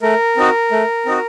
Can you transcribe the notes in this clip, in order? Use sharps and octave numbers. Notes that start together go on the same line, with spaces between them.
A3 A#4
C4 D#4 F#4
A3
C4 D#4 F#4